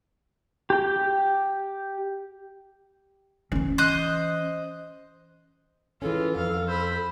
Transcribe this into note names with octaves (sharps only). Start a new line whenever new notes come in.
G4 G5
E3 C#4
C5 D#5 F#6
E3 G#3 C#4 F4 A4
F2 F5
C5 B5